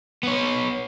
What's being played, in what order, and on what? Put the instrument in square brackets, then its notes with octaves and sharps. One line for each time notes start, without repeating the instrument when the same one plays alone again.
[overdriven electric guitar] B3 C#5